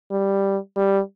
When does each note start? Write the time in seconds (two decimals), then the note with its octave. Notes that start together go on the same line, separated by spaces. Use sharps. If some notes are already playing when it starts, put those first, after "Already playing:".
0.11 G3
0.76 G3